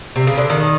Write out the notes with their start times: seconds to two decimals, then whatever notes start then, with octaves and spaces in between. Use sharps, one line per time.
0.16 C3
0.27 C#3
0.38 D3
0.50 D#3